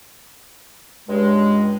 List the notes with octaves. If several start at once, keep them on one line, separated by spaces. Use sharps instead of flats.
C#2 G2 G#3